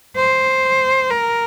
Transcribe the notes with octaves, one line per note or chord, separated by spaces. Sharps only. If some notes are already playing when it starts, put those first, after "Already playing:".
C5
A#4